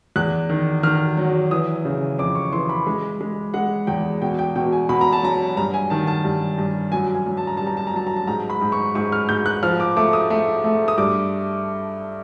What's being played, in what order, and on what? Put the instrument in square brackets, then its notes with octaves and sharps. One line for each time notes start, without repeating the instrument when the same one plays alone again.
[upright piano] E2 F#6
D#3
D#3 F6
F#3
E3 D#6
C#3
F2 D6
C#6
E3 C6
B5
G#3
G#3
G#3 F#5
E2 G5
B2 G5
G5
B2 G5
G#5
B2 B5
A#5
A5
F#3 A#5
G2 A#5
G#5
D#3 A5
A5
G2
G2
F#2 G#5
G#5
F#2
A5
A#5
G3 A5
A#5
A5
A#5
F#2 A5
A#5
A5
G#2 A#5
B5
G#2
C#6
G#2 C#6
F6
G#2 G6
F#6
F3 F6
D6
A3 D6
D#6
A3
A3
D#6
G2 D6